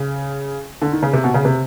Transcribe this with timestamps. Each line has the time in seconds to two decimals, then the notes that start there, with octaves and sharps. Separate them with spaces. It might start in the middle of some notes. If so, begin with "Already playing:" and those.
Already playing: C#3
0.82 D3
0.92 D#3
1.03 C#3
1.13 C3
1.24 B2
1.34 C#3
1.45 C3